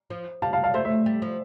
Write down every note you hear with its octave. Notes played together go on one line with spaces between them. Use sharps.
F3
G3 F5 A5
F5 A5
F5 A5
A3 C5 E5
C5 E5
G3
F3